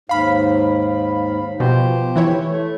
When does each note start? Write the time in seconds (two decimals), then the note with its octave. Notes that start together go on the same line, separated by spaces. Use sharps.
0.09 D#2 G#2 F5 B5
1.60 B2 F3 G4 C5
2.16 E3 E4 C#5
2.49 A3